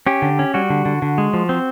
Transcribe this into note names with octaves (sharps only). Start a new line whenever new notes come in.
C#4 G4
D3
C#4
G3 F#4
D3
D3
D3
G#3
F3
C4